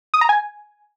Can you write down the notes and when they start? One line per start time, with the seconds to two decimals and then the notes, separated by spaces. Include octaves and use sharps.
0.14 D#6
0.21 A#5
0.29 G#5